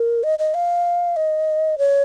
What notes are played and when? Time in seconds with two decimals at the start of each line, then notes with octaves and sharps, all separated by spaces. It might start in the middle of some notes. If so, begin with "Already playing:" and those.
Already playing: A#4
0.23 D#5
0.39 D#5
0.54 F5
1.16 D#5
1.78 C#5